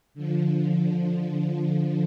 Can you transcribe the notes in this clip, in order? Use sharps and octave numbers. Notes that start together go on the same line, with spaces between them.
D3 F3